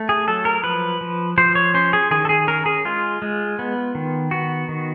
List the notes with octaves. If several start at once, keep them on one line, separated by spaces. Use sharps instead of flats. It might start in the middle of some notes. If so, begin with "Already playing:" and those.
Already playing: A3
G#4
F#3 A4
A#4
F3 B4
F3
F3 C5
C#5
C#4 C5
G#4
D#3 G#4
A4
G#4
C#4 A#4
G#4
G#3 F4
G#3
B3
D#3
B3 F#4
D#3